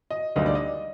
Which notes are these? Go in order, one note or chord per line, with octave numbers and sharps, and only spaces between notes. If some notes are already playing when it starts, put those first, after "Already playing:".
D#5
D2 D3 G3 A#3 D#4 D#5
D5
D#5